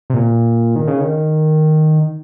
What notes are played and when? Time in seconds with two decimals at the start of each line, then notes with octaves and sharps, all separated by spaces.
0.10 C3
0.14 A#2
0.76 D#3
0.88 C#3
1.01 D#3